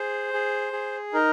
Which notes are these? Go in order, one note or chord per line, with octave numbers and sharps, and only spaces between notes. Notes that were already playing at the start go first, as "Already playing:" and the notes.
Already playing: G#4 C5
G#4
G#4
D#4 A#4